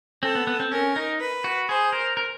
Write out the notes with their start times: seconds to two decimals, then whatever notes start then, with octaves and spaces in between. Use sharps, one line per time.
0.23 C4 A4
0.35 B3
0.47 B3
0.60 C4
0.71 C#4 A#4
0.96 D#4
1.20 B4
1.44 F#4
1.69 G#4 C5
1.93 A#4
2.17 A#4